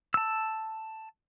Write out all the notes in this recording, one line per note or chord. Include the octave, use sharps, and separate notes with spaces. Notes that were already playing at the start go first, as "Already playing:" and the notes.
A5 E6